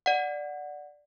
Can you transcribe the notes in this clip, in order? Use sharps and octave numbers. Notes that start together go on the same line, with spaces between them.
D5 F#5